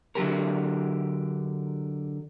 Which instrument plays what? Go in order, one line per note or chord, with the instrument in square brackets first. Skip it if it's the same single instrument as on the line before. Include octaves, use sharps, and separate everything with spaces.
[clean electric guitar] D3 F#3 G4 A#4